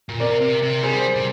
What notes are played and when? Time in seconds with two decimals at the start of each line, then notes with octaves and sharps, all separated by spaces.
0.09 A#2
0.19 C3 A#4 D5
0.41 C3
0.62 C3
0.83 G3 G#4 C5
1.16 C3